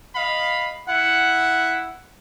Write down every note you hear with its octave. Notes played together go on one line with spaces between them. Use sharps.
D#5 F5 B5
E4 F#5